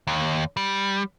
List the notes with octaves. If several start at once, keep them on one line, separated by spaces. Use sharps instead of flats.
D#2
G3